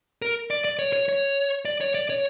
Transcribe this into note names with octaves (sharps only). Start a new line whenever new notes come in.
A#4
D5
D5
C#5
C#5
C#5
D5
C#5
D5
C#5